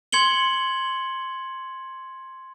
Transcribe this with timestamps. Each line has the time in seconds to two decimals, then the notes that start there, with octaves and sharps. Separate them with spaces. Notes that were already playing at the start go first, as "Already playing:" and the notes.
0.12 C6 G#6 C#7 F#7 G7